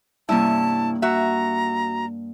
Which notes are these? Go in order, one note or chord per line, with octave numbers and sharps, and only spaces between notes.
G2 C3 A#3 C#4 E4 A5
F#4 E5 A#5